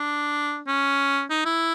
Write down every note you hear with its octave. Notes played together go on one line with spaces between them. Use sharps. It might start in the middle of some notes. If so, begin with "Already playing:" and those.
Already playing: D4
C#4
D#4
E4